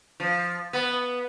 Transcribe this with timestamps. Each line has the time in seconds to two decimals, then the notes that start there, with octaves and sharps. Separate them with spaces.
0.20 F3
0.73 B3